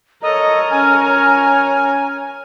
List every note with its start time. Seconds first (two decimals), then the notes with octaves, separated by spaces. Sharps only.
0.23 A4 A#4 C#5 D#5
0.71 C#4 G#5 F6